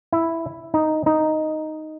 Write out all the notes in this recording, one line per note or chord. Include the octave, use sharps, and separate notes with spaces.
E4
D#4
D#4